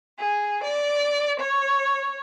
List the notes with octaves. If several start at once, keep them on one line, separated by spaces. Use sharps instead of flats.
G#4
D5
C#5